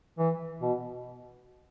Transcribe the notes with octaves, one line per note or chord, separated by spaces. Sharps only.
E3
B2